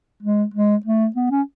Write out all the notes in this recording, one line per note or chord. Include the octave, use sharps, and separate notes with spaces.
G#3
G#3
A3
B3
C#4